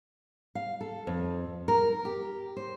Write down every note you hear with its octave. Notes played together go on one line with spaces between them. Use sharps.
F5
A4
F2
A#4
G4
C5